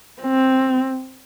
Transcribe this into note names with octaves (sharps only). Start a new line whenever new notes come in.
C4